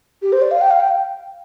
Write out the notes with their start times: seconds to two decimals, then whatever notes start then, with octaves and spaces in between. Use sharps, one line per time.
0.22 G4
0.32 C5
0.42 D5
0.51 F5
0.61 G5
0.71 F5
0.80 G5